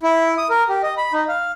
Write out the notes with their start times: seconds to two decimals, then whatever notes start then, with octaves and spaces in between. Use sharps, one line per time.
0.03 E4
0.38 D#6
0.50 A#4
0.69 G4
0.83 D#5
0.97 B5
1.13 D#4
1.28 F5